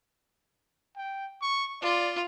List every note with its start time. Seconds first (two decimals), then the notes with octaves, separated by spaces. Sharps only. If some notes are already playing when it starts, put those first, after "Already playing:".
0.97 G5
1.41 C#6
1.82 F4 D5